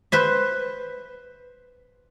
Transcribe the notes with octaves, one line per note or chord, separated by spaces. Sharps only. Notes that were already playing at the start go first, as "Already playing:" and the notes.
B4 C5 E5